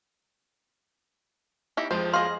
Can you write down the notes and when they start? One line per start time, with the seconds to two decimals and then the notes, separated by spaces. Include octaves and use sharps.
1.77 D#4 E4 G4
1.91 F2 F3 G#3 C5
2.13 G#4 D#5 F5 C6